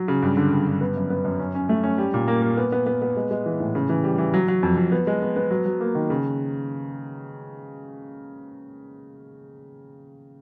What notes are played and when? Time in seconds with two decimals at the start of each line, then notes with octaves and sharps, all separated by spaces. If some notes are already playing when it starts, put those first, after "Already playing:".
Already playing: F#3
0.08 C#3
0.22 G2
0.37 D3
0.51 G2
0.67 G2
0.81 B3
0.96 F#2
1.10 B3
1.25 F#2
1.39 C#4
1.55 C#4
1.69 A3
1.84 C#4
1.98 G3
2.14 A#2
2.28 A#3
2.42 A#3
2.57 B3
2.72 B3
2.86 B3
3.02 B3
3.17 G#3
3.31 G#3
3.46 E3
3.60 A2
3.75 C#3
3.89 E3
4.04 G3
4.18 E3
4.34 F#3
4.48 F#3
4.63 F2
4.77 F2
4.92 B3
5.07 G#3
5.22 B3
5.36 B3
5.51 F#3
5.66 F#3
5.80 A#3
5.95 D#3
6.10 C#3